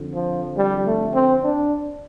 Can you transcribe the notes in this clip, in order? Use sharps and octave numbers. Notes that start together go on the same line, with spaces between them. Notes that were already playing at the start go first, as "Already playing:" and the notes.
Already playing: F2 D3
F3
G3
A3
C4
D4